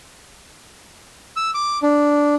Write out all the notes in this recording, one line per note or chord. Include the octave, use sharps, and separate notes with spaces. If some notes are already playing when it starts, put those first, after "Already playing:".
E6
D6
D4